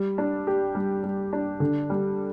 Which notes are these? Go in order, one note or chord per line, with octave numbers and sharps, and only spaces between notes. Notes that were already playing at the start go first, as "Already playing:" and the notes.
Already playing: G3
D4
G4
G3
G3
D4
D3
G3